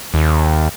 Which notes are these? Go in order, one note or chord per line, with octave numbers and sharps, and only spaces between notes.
D#2